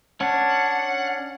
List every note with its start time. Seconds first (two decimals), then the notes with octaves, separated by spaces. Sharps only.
0.21 C#4 D4 F#5